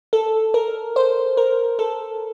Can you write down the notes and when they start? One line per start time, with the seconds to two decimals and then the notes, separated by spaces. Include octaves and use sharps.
0.13 A4
0.54 A#4
0.96 C5
1.37 A#4
1.79 A4